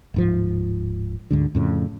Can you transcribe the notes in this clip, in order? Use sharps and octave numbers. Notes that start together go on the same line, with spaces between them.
D1 G#2 F3
D2 G#2 D3
F2 A2 C#3